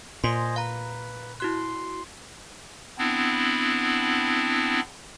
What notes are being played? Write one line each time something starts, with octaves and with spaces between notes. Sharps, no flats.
A#2 C5 D#5 G#5 C6
B4 F5 A#5
E4 F#4 C6 F#6
B3 C4 D4 E4